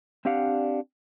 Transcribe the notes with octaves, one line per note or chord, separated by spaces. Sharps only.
C4 D4 G4 D5 F5 F#5